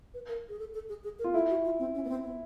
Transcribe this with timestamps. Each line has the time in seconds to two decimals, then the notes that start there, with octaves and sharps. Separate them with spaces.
0.14 B4
0.29 A#4
0.49 G#4
0.59 A4
0.74 A4
0.89 G#4
1.04 G#4
1.19 A#4
1.24 F4
1.34 E4 A4
1.50 F#4
1.65 F4
1.79 C4
1.95 C#4
2.04 B3
2.09 C4
2.25 B3